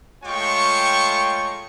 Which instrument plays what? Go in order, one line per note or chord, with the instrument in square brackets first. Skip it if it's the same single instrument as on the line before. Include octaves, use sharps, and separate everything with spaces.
[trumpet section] G#3 A3 F4 C#5 G5 C#6